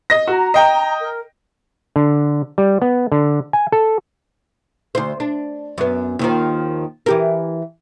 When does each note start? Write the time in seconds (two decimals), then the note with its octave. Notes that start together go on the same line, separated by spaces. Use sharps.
0.10 D#5 A#6
0.28 F#4 A#5
0.54 D#5 G5
1.00 A#4
1.96 D3
2.58 G3
2.82 B3
3.12 D3
3.53 G#5
3.72 A4
4.95 D2 C5
5.20 D4
5.78 F#2 B3
6.19 D#2 D#3 F3
7.06 E3 G4 A#4